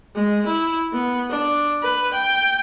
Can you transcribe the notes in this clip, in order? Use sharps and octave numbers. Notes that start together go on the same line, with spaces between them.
G#3
E4
B3
D4
B4
G5